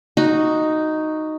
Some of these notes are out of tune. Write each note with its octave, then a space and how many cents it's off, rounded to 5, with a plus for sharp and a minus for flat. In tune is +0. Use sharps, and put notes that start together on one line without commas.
D#4 +0 F#4 +0